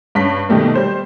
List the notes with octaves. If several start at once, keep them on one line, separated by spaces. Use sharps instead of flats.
G2 C#4 B6
B2 D#3 G3 A3 A#3
G3 C5 C6